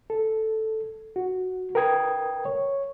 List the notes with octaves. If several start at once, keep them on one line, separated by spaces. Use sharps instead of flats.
A4
F#4
A#4 B4 G5 D#6 G#6
C#5